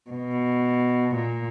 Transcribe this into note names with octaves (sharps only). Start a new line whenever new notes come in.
B2
A#2